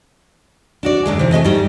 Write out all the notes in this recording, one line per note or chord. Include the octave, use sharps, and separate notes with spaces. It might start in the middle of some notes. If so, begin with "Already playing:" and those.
D4 F#4 D5
F#2 D3 G#3
C3 E3
A3 B3 D#5 G#5
G#2 G3